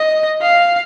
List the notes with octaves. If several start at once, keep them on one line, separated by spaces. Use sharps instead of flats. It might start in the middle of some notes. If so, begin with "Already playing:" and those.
Already playing: D#5
F5